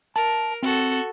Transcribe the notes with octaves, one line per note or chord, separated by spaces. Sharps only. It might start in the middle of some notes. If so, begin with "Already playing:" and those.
A#4 A5
C4 F#4 A4